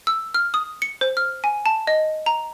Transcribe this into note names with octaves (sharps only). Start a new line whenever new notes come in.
E6
F6
D#6
C#7
C5
F6
G#5
A5
D#5
A#5